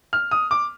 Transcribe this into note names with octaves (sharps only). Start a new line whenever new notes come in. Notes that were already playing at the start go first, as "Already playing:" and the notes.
F6
D#6
D6